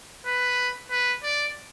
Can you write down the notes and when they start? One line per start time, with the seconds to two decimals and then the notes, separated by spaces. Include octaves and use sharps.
0.26 B4
0.91 B4
1.23 D5